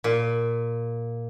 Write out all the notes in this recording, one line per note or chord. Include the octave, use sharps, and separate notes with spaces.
A#2